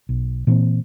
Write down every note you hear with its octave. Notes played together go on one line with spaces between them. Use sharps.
B1
A#2 E3 A#3 C4